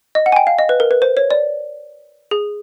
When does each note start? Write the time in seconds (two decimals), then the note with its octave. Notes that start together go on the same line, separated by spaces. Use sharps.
0.15 D#5
0.26 F#5
0.32 G#5
0.36 G5
0.47 F5
0.59 D#5
0.69 B4
0.80 A#4
0.91 B4
1.02 C5
1.17 C#5
1.31 D5
2.31 G#4